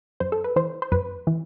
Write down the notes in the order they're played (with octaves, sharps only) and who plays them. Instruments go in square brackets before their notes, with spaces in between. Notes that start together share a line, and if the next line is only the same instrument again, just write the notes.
[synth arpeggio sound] F#2 C5
A4
B4
E3 C5
C5
F#2 B4
E3